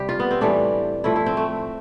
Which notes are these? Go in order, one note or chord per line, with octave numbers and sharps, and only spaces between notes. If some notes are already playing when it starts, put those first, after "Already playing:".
Already playing: C3 G3 G4
F4
B3
C4
A2 E3 G3 D4
A2 F3 E4
E4
C4
A3